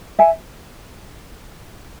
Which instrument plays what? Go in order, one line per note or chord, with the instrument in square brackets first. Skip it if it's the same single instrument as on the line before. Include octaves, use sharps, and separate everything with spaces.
[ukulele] E5 G#5